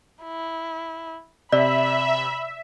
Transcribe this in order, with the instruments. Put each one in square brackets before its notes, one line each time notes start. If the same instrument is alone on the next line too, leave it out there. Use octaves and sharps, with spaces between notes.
[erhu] E4
[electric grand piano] C3 [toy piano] D5 [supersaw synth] E5 [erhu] B5